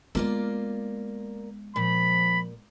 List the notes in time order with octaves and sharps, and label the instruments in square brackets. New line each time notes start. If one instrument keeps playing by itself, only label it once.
[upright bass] G#3 B3 [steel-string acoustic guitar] A#3 F4 D5
[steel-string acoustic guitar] A#2 [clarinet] F3 [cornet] B5